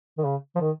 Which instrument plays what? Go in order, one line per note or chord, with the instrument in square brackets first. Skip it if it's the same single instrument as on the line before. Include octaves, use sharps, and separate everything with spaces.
[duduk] D#3
C#3
F3
D#3